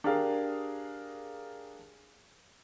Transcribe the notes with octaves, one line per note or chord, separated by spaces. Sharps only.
D4 G4 G#4 A#4 F5